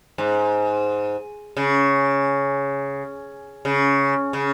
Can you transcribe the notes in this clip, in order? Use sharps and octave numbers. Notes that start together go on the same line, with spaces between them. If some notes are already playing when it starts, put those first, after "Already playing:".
G#2
C#3
C#3
C#3